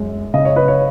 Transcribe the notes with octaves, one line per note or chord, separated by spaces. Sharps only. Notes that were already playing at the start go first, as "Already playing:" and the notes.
Already playing: F#2 G#3
C#3 D#5
C#5
B4
C#5